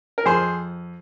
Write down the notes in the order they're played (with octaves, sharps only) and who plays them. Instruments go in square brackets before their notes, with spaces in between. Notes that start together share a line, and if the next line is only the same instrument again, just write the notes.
[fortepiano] A#4
F2 G#4 C5